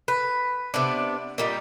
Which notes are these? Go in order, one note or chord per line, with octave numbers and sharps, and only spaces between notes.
B4
C3 B3 D4
A#2 G3 D#4